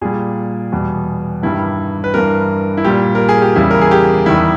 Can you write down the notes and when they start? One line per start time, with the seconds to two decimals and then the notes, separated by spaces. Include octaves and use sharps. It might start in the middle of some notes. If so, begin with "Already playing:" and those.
0.01 A#2 G3 G#4
0.72 E2 B2 G3
1.43 G2 D#3 G3 E4
2.04 B4
2.14 G2 E3 G3 A#4
2.77 E4
2.84 A#2 G3 G4
3.15 A#4
3.29 G#4
3.42 G4
3.56 E2 C#3 G3 E4
3.71 A#4
3.81 G#4
3.91 G4
4.26 E2 D#3 G3 E4